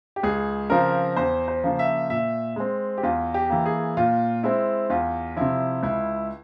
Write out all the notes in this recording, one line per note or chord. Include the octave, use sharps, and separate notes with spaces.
G4
C#2 G#4
C#3 F3 C4 A#4
E2 C5
C5
C#3 F3 A#3
E5
A#2 E5
G#3 C4
G4
E2 F4
G4
E3 A#3
G#4
A#2 F4
G#3 C4 E4
E2 F4
C3 F3 E4
C#2 E4